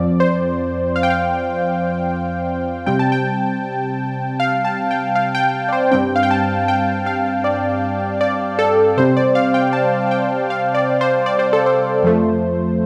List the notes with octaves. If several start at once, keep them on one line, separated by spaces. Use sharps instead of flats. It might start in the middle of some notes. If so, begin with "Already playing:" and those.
Already playing: F2 F3 C4 D5
C5
F5
G5
F5
C3 G3 C4 G5
A5
G5
F5
A5
G5
F5
G5
D5
C5
G2 G3 C4 G5
F5
G5
A5
G5
F5
D5
D5
A4
C3 G3 C4 C5
D5
F5
G5
A5
G5
F5
D5
C5
D5
C5
A4
C5
F2 F3 A3